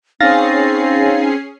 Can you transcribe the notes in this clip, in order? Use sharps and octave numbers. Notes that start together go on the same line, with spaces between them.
C4 C#4 D#4 G#4 F5 A6 A#6 C7